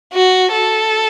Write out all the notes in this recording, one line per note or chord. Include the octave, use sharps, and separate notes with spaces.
F#4
A4